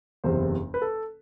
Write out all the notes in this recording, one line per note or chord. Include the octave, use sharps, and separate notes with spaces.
F#1 E2 C3 E3 C5
B4
A4